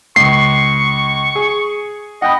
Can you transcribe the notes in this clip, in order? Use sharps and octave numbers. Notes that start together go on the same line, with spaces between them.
C#2 C#6 C7
G#4
D#5 F#5 G5 B5